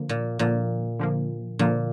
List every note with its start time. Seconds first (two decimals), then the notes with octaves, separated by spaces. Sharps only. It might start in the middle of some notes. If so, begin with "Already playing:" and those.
Already playing: D3 F3 A#3
0.09 A#2
0.39 A#2 D3 F3 A#3
1.00 D3 F3 A#3
1.59 A#2 D3 F3 A#3